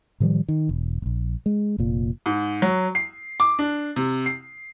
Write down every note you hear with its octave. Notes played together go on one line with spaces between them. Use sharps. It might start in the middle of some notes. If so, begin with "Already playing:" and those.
A2 D#3 F3 G3
D#3
E1
E1 A#1
G#3
F1 A#2
G#2
F#3
C7
D6
D4
C3
C7